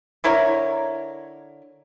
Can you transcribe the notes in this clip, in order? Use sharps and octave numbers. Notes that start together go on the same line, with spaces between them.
D3 E4 A#4 C#5